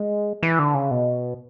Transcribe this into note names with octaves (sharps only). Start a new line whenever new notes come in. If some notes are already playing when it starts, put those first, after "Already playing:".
Already playing: G#3
E3
D3
C#3
B2